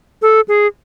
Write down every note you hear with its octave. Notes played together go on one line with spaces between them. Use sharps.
A4
G#4